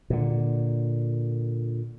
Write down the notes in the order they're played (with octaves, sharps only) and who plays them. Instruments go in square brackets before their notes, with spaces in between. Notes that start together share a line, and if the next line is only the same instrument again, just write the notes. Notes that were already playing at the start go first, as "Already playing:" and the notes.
[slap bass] A#2 D3